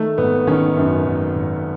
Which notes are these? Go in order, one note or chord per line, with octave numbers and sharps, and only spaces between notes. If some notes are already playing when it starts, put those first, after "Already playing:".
Already playing: D#3 A3
G#1 B3
D#3 C#4
F#2
G#1
G#1